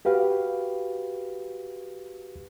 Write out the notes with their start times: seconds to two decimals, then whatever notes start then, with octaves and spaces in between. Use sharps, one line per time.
0.05 F#4 G4 B4 F5